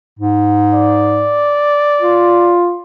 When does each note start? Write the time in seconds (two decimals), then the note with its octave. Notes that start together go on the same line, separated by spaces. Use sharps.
0.19 G#2
0.74 D5
1.99 F4